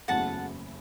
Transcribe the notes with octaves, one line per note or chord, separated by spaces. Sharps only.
F#1 E2 C#3 F#3 A3 F#5 A5